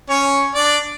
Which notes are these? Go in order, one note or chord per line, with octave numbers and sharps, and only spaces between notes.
C#4 C#5
D4 D5